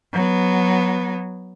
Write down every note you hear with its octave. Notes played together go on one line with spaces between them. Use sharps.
F#3 B3